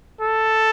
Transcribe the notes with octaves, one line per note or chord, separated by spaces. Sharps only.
A4